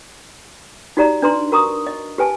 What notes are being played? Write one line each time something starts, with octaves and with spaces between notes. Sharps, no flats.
D#4 F#4 G4 D5 A#5
D4 B4 A#5 C6
F#4 A#4 A#5 C#6 D#6
D#5
G4 B4 G#5 A5